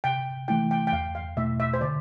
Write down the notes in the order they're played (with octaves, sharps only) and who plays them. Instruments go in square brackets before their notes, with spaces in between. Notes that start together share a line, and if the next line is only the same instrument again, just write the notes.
[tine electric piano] C3 [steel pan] G5
[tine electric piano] E3 A3 E4 [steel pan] G5
[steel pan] G5
G5
[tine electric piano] E2 [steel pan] F5
[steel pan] F5
[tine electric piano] B2 A3 E4 [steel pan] E5
[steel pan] E5
C5
[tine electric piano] D3 [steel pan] D5